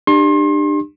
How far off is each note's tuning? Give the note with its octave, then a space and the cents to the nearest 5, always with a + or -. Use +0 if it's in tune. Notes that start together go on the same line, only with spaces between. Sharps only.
D4 +35 G4 +15 C6 +35